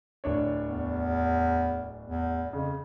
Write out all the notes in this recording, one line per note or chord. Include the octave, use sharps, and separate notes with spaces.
D1 D4 C#5
E2
E2
F2 C#3